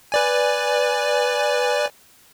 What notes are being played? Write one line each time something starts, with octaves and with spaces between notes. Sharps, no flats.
B4 D5 G#5